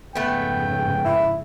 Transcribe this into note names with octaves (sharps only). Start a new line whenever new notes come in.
F2 G#2 C#3 A3 B3 G5
E4